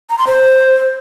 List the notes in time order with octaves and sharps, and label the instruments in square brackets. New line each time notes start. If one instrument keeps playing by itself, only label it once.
[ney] A#5
C6
C5